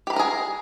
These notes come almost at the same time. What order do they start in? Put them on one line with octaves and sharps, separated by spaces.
G4 B5 A#5 A#4 G#4